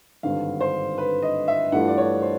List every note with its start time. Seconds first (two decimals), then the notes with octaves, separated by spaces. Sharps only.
0.23 G#1 G2 D3 F5
0.61 C5
0.98 B4
1.22 D#5
1.48 E5
1.72 G2 E3 A3 D4 F4 F#5
1.88 D5
1.98 C#5
2.22 C5